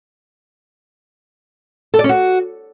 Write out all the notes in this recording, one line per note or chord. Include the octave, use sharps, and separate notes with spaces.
A4
D5
C#4
F#4